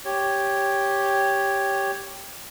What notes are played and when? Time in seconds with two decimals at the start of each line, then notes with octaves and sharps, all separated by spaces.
0.05 G4 C#5